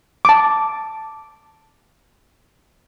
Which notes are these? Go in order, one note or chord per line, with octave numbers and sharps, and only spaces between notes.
A5 D6